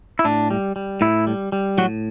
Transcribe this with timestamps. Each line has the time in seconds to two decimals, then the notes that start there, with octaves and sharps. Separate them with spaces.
0.19 E4
0.25 A2 D4
0.51 G3
0.76 G3
1.01 A2 E4
1.27 G3
1.52 G3
1.78 A2 F#3 F#4